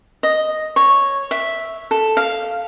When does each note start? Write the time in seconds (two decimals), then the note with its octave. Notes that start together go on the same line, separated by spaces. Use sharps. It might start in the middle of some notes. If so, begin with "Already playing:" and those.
0.23 D#5
0.76 C#5
1.31 E5
1.91 A4
2.17 F5